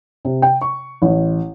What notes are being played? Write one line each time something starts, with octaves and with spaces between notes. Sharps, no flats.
C3
G5
C#6
A1